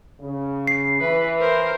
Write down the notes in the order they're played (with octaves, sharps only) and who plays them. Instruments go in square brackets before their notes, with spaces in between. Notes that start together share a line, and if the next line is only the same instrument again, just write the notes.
[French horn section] C#3
[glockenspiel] C7
[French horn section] E3 [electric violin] B4
[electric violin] A#4 C5